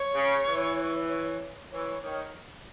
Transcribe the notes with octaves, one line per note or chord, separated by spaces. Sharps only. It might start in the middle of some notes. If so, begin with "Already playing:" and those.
Already playing: C#5
C#3
E3
C#5
E3 C#5
D#3 C#5